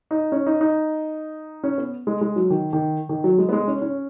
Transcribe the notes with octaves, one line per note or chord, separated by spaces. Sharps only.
D#4
C#4
D#4
D#4
C#4
B3
G#3
G#3
F#3
D#3
D#3
D#3
F#3
G#3
B3
G#3
C#4
C#4